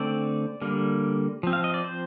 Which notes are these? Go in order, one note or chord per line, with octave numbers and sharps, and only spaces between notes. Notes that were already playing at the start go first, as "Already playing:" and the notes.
Already playing: D3 A3 C4 D5
D3 G3 A#3
F3 C4
F5
D#5
D5
C5